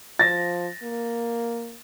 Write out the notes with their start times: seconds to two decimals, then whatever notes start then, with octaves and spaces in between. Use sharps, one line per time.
0.19 F3 A6 A#6
0.83 A#3